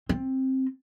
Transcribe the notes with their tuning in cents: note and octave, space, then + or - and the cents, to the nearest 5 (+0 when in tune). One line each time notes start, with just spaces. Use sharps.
C4 +10